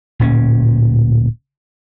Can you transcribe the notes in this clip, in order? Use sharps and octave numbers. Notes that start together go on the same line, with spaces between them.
D1 A#2 C#4